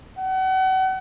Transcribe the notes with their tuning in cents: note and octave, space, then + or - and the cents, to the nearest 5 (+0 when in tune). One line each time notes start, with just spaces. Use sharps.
F#5 +35